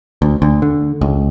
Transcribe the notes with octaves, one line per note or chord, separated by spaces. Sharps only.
D2
D2
D3
C#2